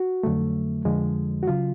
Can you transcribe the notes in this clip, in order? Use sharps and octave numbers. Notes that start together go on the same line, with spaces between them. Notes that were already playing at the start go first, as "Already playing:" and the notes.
Already playing: F#4
F2 D3 F#3 A3
F2 D3 F3 G#3
F#4
C#3 F#3 F4